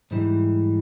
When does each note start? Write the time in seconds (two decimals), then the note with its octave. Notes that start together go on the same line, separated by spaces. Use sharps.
0.11 G#2 E3 G3